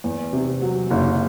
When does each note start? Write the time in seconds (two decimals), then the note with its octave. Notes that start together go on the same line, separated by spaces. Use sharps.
0.04 E2
0.33 C3
0.62 F#3
0.91 F#1